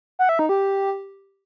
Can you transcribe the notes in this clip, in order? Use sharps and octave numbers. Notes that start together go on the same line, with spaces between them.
F#5
E5
D#4
G4